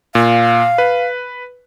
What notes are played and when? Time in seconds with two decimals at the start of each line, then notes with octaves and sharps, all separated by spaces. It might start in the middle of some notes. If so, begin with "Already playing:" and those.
0.15 A#2 F5
0.78 B4